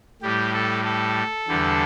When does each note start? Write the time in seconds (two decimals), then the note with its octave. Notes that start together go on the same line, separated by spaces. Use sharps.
0.22 A2 G3 G4
0.53 A4
0.84 A4
1.48 E2 D3 G3